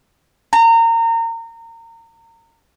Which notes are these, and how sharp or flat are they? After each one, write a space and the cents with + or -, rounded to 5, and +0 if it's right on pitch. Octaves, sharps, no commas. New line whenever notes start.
A#5 -30